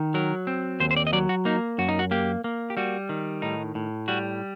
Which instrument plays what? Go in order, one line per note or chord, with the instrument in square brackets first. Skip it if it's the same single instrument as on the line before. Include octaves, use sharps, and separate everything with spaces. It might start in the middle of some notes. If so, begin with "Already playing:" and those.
Already playing: [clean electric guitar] D#3
F#3 A#4
C4
D#2 C5
C5
D5
D#5
F#3 D5
F#4
A#3 D#4
F#2 F#4
D#4
F#4
A#3 G4
A#3
G4
G3 F#4
D#3
A2 D#4
A2
G3 F#4